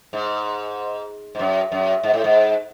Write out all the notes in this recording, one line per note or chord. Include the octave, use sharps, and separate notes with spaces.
G#2
G#2
F#2
F#2
G#2
A2
G#2